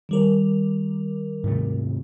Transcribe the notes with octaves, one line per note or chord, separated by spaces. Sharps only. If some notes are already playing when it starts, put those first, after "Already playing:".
D#3 G3 A#4
G#2 C3 A3